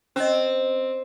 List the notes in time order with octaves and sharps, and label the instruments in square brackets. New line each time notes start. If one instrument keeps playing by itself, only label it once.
[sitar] C4 [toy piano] C#4 D#5